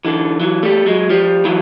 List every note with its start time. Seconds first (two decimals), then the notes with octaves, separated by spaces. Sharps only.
0.05 D3 E3
0.40 E3 F#3
0.63 G3 A3
0.86 F#3 G#3
1.10 F3 G3
1.45 E3 F#3